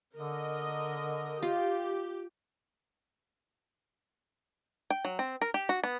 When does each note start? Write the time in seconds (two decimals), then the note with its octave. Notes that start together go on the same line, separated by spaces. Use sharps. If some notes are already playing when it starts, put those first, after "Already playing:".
0.16 D3 A#4 D#5
1.43 F4 G4
4.90 G5
5.05 F#3
5.19 C4
5.41 A#4
5.54 G4
5.69 F#4
5.84 B3